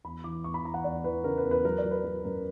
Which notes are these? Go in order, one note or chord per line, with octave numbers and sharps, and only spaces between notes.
E2 B5
E3 D6
E2 C#6
B5
E3 A#5
F#5
E2 D5
E3 B4
C#3 A#4
B4
E2
B4
F#3 A#4
D5
F#3
B4
F#3 A#4
F#2 A#4